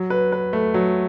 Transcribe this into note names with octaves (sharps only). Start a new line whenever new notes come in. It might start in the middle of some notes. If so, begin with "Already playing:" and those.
Already playing: F#3
B4
B4
A3
F#3